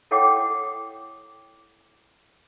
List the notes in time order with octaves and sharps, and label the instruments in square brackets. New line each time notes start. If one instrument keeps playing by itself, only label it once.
[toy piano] E4 A4 C#5 F#5 G5 D6